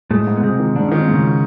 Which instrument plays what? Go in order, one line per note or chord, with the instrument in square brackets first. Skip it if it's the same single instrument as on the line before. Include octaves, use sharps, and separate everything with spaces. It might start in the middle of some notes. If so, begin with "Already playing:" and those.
[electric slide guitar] A2 A3 [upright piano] G#3
[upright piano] G#2
[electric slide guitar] B3
[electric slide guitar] C3 C4 [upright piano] G#3
[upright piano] D#3
[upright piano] G#2 [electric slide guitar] D4
[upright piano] D#3 [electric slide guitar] C#4
[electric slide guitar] C4
[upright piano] G#2
[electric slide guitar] C#3 C#4